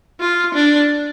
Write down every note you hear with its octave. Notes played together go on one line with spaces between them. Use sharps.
F4
D4